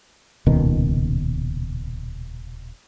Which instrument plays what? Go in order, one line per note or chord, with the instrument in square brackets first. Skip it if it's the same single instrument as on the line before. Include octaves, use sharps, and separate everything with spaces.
[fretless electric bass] D#1 C#2 B2 D#3